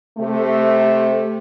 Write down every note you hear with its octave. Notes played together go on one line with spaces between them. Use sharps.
C3 A3